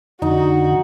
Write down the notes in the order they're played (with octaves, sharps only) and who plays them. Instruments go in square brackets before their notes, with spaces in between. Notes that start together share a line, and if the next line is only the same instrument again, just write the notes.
[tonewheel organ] F2 D3 [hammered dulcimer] D#4 [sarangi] F#4